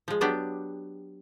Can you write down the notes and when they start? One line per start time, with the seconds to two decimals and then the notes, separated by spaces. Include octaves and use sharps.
0.08 F3 G#3
0.21 F#3 B3 D4 G4